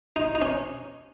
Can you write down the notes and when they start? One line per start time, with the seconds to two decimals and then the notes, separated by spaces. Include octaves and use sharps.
0.16 D#4
0.35 D#4
0.42 C#4